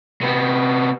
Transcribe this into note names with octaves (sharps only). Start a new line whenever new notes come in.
C3 B3